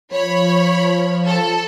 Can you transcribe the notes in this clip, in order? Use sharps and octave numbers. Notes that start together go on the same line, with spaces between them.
F3 C#5 B5
A4